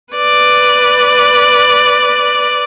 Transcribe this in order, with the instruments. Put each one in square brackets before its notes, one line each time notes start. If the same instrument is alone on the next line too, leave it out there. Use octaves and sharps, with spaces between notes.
[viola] B4 D5